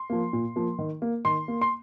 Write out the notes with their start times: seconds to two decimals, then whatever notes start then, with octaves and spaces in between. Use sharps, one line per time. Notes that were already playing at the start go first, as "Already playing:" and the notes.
Already playing: C6
0.10 F3 A#3
0.33 A#2
0.56 F3 A#3
0.79 D#3
1.02 A#3
1.25 D#3 C6
1.48 A#3
1.61 C6